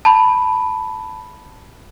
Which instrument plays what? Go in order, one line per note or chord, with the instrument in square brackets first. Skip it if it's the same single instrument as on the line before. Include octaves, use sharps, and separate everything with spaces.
[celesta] A5 B5